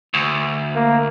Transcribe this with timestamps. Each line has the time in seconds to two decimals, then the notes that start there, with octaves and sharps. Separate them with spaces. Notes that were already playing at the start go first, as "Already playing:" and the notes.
0.14 D2
0.76 A#3